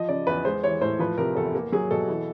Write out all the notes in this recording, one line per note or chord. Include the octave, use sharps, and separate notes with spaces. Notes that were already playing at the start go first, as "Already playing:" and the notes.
Already playing: F3 D#5
C#3 D5
E2 B4
G#3 C5
E3 C#5
A2 C5
F3 B4
C3 A#4
E2 A4
A#3
F#3 G#4
B2 A4
E3